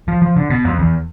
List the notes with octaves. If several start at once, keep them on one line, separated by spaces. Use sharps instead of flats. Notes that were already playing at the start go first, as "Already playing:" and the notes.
F3
F3
D3
B2
F2
E2